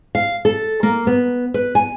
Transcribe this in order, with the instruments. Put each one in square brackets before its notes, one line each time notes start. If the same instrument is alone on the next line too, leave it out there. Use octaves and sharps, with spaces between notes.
[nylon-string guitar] F5
A4
A#3
B3
B4
G#5